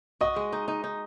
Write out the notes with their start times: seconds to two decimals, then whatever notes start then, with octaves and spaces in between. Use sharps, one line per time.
0.21 F#4 D#5
0.36 G#3
0.53 D#4
0.68 D#4
0.84 D#4